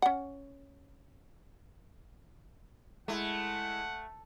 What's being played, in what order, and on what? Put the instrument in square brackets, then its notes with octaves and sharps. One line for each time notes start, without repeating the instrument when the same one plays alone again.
[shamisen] C#4 F#5
[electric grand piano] G#3 E4 [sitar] A3 [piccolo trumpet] F#5